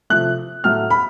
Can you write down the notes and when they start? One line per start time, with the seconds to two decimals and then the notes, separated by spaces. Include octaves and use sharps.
0.10 C3 F3 A3 F#6
0.64 A2 F#3 A3 F6
0.90 B5